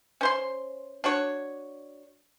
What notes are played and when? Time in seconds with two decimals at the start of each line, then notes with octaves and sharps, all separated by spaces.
0.21 C#4 C5 C6
1.04 D4 F#4 C#5